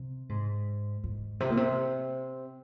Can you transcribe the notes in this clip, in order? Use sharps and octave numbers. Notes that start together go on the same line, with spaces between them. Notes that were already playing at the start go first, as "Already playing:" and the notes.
Already playing: C3
G#2
G#2
C3
A#2
C3